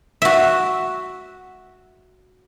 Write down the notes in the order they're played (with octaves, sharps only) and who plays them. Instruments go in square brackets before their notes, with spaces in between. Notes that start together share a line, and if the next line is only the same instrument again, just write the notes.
[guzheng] F#4 E5